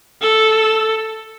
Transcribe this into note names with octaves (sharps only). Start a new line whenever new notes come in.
A4